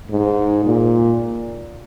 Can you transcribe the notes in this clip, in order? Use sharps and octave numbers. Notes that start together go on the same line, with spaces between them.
G#2
A#2